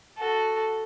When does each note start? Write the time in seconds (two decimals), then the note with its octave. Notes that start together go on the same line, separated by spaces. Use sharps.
0.18 F#4 A4